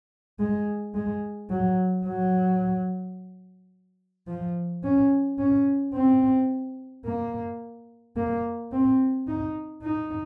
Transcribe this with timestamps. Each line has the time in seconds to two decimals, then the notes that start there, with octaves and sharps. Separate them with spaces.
0.39 G#3
0.94 G#3
1.50 F#3
2.06 F#3
4.28 F3
4.84 C#4
5.38 C#4
5.94 C4
7.05 A#3
8.16 A#3
8.72 C4
9.27 D#4
9.82 D#4